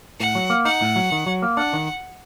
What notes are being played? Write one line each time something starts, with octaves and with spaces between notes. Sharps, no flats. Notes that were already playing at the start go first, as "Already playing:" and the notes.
A2 F#5
F#3
A#3
D#4 F#5
A2
F#3
D#3
F#3
A#3
D4 F#5
D#3